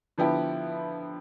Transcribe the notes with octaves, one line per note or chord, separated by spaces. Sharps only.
D3 F3 B3 E4 G4